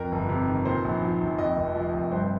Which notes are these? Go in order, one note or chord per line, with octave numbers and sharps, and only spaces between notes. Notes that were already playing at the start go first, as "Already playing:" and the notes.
Already playing: F2 A#4
G1
C3
D#3
A#2 C5
A#1
F3
A#1
F2 D#5
F1
F3
F1
G2 C5